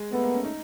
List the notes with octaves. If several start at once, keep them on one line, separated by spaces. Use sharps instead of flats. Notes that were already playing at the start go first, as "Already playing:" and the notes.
Already playing: G#3
A3 B3
A#3
C#4
D#4